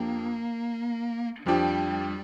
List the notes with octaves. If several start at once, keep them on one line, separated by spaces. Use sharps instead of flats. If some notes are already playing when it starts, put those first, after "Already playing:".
Already playing: F2 F3 A#3 D4 G4
F2 F3 G3 D4 G4